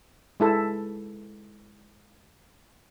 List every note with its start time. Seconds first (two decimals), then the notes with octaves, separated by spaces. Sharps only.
0.40 G#3 E4 A4